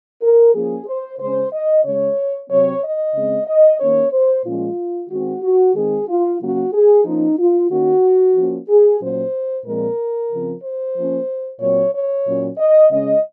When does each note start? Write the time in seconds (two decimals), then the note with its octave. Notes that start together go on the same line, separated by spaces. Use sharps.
0.22 A#4
0.54 F3 A#3 C#4 G#4
0.87 C5
1.20 C#3 G#3 C#4 C5
1.53 D#5
1.84 C#3 G#3 C#4 C#5
2.51 C3 F#3 C4 C#5
2.83 D#5
3.14 C#3 G#3 C4
3.47 D#5
3.80 D#3 A#3 C#4 C#5
4.13 C5
4.45 A#2 F3 G#3 C#4 F4
5.10 D#3 G#3 C4 F#4
5.43 F#4
5.75 D#3 G#3 C4 G#4
6.08 F4
6.41 C#3 F#3 A#3 C#4 F#4
6.73 G#4
7.05 F3 A#3 C#4 D#4
7.38 F4
7.70 D#3 A#3 C#4 F#4
8.35 F3 A#3 C#4
8.69 G#4
9.00 A#2 F#3 A#3 C#4 C5
9.66 A#2 F3 G#3 C4 A#4
10.32 C#3 F3 C4
10.63 C5
10.97 F3 A#3 C#4
11.61 A#2 F#3 C4 C#5
11.94 C#5
12.27 A#2 F#3 C#4
12.58 D#5
12.92 C#3 G#3 C#4 D#5